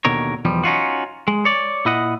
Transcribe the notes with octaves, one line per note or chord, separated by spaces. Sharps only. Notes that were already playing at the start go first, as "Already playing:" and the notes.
D#2 B2 D3 A#4 C#5
B1 E2 F3 G3
C#4 D#4 F4 F#4
G#3
C#5 D5
A#2 E4 D#5 F#5